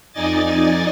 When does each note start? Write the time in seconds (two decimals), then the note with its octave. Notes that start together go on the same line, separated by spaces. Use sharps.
0.12 F2 D#4 D5 D#5 G#5 A6